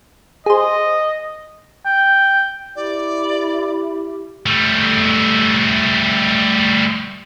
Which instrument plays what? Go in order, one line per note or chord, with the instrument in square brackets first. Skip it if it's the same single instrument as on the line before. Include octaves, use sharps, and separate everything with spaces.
[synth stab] G#4 C5 [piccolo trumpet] D#5
[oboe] G5
[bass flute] E4 [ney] G4 [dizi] D5
[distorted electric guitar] G3 A3